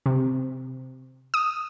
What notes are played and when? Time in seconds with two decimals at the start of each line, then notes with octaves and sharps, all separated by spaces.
0.06 C3
1.34 D#6